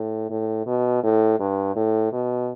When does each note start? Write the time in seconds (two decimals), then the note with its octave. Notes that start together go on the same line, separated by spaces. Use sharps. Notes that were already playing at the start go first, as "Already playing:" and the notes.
Already playing: A2
0.30 A2
0.66 B2
1.03 A2
1.39 G2
1.76 A2
2.12 B2